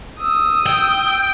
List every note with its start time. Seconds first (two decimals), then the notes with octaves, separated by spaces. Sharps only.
0.19 D#6 E6
0.66 G5